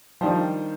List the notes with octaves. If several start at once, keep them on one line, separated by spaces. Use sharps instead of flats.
D#3 F3 G3 D4 G4 C5